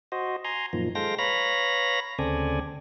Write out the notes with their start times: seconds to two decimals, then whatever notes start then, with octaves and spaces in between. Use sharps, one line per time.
0.12 F#4 C5 D#5
0.45 G#5 A#5 C6
0.73 F#2 A#2 D#3 F3
0.95 G#3 A4 C5 F5 G5 A#6
1.19 B4 C#5 F5 A#5 B5 A#6
2.19 D2 C#3 C4 A4 D5 G#5